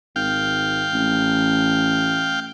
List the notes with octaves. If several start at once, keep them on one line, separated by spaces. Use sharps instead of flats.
G#1 F5 G5
A1